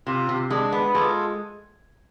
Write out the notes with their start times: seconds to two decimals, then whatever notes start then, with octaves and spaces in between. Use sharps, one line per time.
0.07 C3 F4
0.29 C3
0.50 G#3 D4
0.72 B3
0.94 G#3 F4 A4